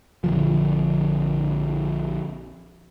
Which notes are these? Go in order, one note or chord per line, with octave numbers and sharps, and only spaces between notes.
A#1 D3 F3